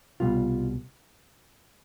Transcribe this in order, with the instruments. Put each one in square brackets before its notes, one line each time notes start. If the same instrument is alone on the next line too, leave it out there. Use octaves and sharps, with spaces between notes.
[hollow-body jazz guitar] C2 B2 G3 F4